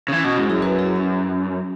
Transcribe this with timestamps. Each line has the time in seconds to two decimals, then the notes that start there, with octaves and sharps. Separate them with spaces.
0.08 C#3
0.12 E3 C#4
0.24 B2 C#4 F#4
0.37 G#2 E4 G#4
0.49 F#2 E4 G#4
0.62 F#4 B4
0.79 E4 G#4
0.96 C#4